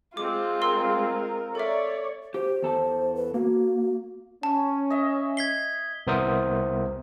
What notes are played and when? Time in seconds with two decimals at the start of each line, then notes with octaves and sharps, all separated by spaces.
0.17 G#3 C4 F4 D6
0.62 A#4 F5 C6 E6
1.55 A4 C#5 D5 E5
2.34 G4 C5
2.62 E2 A4 A5
3.15 B4
3.34 A#3 F#4
4.43 C#4 A5
4.90 D#5 E5
5.37 G#6 B6 C7 G7
6.07 C2 B3 A#4 C5 E5 D#6